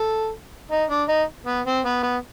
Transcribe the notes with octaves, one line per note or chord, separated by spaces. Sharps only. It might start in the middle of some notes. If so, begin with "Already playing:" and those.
Already playing: A4
D#4
D4
D#4
B3
C4
B3
B3